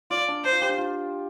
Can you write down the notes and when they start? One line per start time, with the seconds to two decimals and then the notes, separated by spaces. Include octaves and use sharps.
0.10 F4 D5
0.28 D4
0.44 D4 C5
0.52 F4
0.61 G4
0.69 D4
0.78 F4